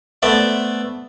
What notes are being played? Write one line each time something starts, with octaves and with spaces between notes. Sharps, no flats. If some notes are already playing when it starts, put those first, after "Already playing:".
A3 B3 C5 D5 E5